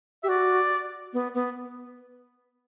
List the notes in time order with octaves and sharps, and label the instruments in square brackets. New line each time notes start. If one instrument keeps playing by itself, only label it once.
[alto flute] G4 [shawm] E5
[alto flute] F#4 [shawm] D5
[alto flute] B3
B3